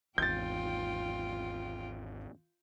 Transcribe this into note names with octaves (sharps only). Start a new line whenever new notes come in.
G#1 E2 F4 G5 G6 A6